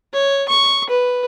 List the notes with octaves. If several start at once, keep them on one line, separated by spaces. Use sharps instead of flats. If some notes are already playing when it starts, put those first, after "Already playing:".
C#5
C#6
B4